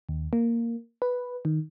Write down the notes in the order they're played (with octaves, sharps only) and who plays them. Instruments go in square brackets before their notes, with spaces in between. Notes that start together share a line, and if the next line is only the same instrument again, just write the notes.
[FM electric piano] D#2
A#3
B4
D#3